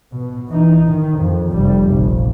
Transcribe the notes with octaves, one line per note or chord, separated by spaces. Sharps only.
B2
E3 D#4
D#3
F2
F1 G3
F1 A#1